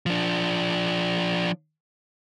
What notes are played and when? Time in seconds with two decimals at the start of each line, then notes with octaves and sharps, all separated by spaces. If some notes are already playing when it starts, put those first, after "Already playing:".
0.06 F3 D4